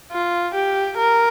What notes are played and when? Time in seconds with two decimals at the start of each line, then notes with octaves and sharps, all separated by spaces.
0.12 F4
0.54 G4
0.98 A#4